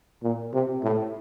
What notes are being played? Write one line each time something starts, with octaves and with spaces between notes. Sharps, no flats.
A#2
C3
A2